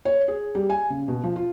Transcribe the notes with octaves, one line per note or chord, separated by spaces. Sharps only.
C#5
G#4
G3
G#5
C#3
B2
F3
F4